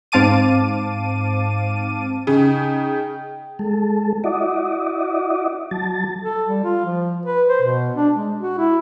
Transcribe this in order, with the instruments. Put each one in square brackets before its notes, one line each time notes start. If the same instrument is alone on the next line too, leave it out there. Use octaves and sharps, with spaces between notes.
[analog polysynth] G#2 C4 F5 A5 D6 D#7
[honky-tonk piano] C#3 [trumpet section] D#4 D#5 G5
[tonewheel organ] G#3 A4
E4 F#4 D5 D#5
F#3 A5
[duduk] A4
G3
F4
F3
B4
C5
B2
D4
G#3
F#4
E4